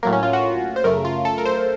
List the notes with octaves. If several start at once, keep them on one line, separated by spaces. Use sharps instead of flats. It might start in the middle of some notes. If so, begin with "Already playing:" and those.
A2 F#3 A#3 A#4
C#4
F4
F#4
C5
F#2 C#3 A3 A#4
F4
A4
A#4
C5